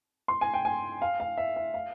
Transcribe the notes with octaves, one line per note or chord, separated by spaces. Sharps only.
C6
G#5
G5
G#5
F5
F5
E5
E5
F5